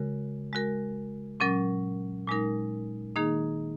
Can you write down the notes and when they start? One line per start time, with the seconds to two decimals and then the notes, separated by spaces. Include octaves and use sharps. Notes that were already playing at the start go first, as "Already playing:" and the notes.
Already playing: C#3 G#3 F#4 A#4
0.53 G#3 F#4 A#4
1.40 A#2 F#3 C#4 A#4
2.28 A#2 G#3 D#4 A#4
3.16 D#3 A#3 D#4 G#4